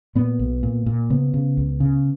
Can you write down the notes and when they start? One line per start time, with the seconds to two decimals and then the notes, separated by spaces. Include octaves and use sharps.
0.15 A#2 B3
0.39 B1
0.63 A#2
0.86 A#2
1.10 C#3 B3
1.34 C#3
1.57 C#2
1.80 C#3